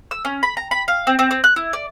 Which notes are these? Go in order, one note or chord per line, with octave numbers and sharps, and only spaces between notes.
E6
C#4
B5
A#5
B5
F5
C4
C4
C4
F#6
E4
D5